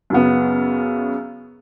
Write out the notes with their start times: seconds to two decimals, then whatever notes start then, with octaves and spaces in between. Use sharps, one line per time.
0.10 F#2 C#3 B3